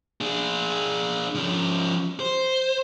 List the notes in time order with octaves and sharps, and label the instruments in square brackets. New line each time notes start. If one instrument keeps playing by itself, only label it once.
[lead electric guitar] D4 G#4
F3 C#4
C5